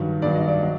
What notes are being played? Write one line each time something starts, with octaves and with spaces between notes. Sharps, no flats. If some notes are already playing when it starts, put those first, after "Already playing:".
Already playing: G2 D#3 F#3
G2 D#3 F#3 D5
D#5
D5
F#3